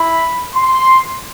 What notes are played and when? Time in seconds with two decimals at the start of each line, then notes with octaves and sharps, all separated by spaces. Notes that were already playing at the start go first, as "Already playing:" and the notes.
Already playing: E4 B5
0.55 C6